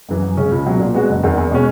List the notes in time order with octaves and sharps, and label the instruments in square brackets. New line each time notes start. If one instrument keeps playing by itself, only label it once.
[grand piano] F#2 E3
F#2
C#3 G#3 C#4 G#4
C#2
B2 F#3
A#2
G#3 B3 F#4
F#1
E2 D#3
E2
B2 G#3 C#4